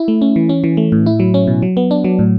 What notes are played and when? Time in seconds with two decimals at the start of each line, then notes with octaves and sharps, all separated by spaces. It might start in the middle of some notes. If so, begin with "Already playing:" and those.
Already playing: E4
0.08 A3
0.22 C#4
0.36 E3
0.49 C#4
0.64 E3
0.77 A3
0.92 A2
1.06 E4
1.20 F#3
1.34 C#4
1.47 B2
1.62 F#3
1.77 B3
1.91 D4
2.04 F#3
2.19 A2